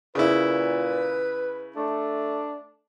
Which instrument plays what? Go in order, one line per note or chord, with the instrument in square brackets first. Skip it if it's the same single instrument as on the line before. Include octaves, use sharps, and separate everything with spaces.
[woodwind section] A#2 [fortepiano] C#3 E4 [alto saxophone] B4
[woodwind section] A3 [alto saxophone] D4